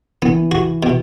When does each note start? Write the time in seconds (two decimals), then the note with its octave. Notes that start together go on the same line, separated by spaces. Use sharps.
0.22 E3 B3
0.52 F#4
0.83 B2